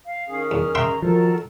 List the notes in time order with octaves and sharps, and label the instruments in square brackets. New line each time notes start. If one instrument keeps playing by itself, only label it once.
[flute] F5
[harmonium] D#3 C#4 G#4
[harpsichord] E2 [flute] F6
[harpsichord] E5 G5 C6 [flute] A#5
[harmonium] D#3 F#3 A#4 [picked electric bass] F3 [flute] A4